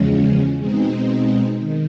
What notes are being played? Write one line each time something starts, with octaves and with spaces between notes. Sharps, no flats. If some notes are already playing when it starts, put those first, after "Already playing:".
Already playing: E2 C#3 F3 G#3 C#4
B2 G#3 C4 D#4
D#3